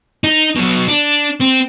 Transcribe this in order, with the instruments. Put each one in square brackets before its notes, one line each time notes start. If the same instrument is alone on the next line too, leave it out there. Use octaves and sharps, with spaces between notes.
[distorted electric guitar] D#4
B2 F#3
D4
C4